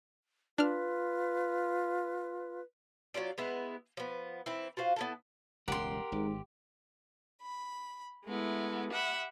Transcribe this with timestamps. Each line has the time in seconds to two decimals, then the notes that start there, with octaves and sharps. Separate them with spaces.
0.58 D4 F4 B4 F6
3.14 F#3 C#4 F4 D5
3.38 G#3 B3 E4
3.97 F3 B3
4.46 E3 C4 E4
4.77 F4 F#4 C5 F5
4.96 B3 E4 A4
5.68 E1 C#2 G2 G4 A#4 F#5 C6
6.12 G#1 G#2
7.43 B5
8.26 G#3 A3 B3 E4
8.91 G4 E5 F#5 B5